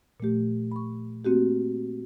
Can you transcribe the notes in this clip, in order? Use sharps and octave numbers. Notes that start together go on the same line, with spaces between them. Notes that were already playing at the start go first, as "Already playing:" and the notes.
A#2 F3 A3 G4
B5 C#6
A3 A#3 C4 F#4 G4